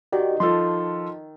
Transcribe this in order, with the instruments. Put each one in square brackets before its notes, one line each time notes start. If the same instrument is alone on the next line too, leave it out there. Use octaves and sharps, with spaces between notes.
[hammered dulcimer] D#3 [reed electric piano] F#4 G4 D5
[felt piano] F3 F4 A4 [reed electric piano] C6